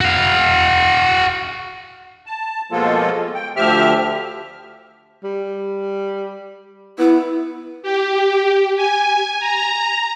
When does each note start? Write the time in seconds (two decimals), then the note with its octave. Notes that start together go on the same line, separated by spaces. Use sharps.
0.01 F#4 F5
2.26 A5
2.72 B2 F3 G#3 A#3 F4 A4
3.35 G5
3.56 D2 F3 G4 E5 F6
5.24 G3
6.99 B3 E4
7.83 G4
8.76 G#5
9.40 A#5